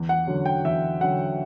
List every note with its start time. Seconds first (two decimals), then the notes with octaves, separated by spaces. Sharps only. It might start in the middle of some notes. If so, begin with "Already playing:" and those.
Already playing: E2
0.09 F#5
0.27 D3 F#3 C#4
0.46 G5
0.65 E2 E5
1.01 D3 F#3 C#4 F#5